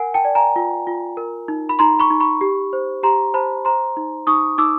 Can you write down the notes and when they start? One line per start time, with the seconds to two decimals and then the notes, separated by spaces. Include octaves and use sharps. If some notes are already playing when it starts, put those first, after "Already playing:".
Already playing: A#4 F#5 G#5
0.14 G5 A5
0.25 D5
0.35 G#5 A#5
0.56 F4
0.87 F4
1.17 A#4
1.48 D#4
1.69 B5
1.79 D#4 A#5 C6
1.99 B5 C#6
2.10 D#4
2.20 B5 C#6
2.41 G4
2.73 C5
3.03 G4 A#5 C6
3.34 C5 A5 B5
3.65 C5 A#5 C6
3.97 D#4
4.27 D#4 C#6 D#6
4.58 D#4 D6 E6